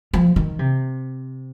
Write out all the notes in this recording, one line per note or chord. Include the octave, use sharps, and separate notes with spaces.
F3
D#3
C3